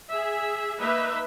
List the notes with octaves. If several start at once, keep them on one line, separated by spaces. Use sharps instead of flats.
G#4 E5
A#3 D#4 B4 E5